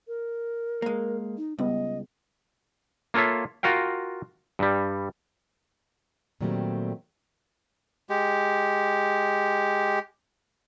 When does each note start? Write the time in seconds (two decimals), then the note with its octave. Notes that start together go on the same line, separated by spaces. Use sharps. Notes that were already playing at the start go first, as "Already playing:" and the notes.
0.08 A#4
0.82 G#3 A#3
1.38 D#4
1.59 C#2 G3 B3 D#5
3.14 A#3 F4 A4 C#5 E5
3.63 F4 F#4 A#4 F5 G5
4.59 G2 G3
6.41 A#2 D#3 F#3 G3 A3 C4
8.10 G#3 G4